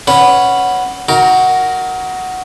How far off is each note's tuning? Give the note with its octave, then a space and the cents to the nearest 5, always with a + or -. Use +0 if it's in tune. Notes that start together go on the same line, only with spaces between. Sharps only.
C#4 +0 B4 +0 F#5 +0
D#4 +35 F#4 +0 A#4 +0